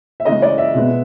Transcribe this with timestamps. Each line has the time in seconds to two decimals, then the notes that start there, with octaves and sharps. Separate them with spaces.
0.20 E5
0.25 C#3 E3 G#3 D#5
0.42 D5
0.58 E5
0.74 B2 G#3 B3